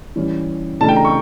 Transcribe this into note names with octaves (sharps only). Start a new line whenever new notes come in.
E3 G3 C#4
C#3 E3 A3 D4 F4 A5
G5
A#5
C#6